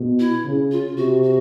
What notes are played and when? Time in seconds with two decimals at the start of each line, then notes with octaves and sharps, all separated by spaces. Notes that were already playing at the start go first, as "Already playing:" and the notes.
Already playing: B2
0.20 E4
0.45 C#3
0.71 F4
0.96 C3 F#4
1.23 F#4